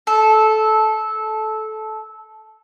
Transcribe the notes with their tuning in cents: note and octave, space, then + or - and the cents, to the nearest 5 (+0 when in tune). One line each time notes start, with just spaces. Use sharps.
A4 -15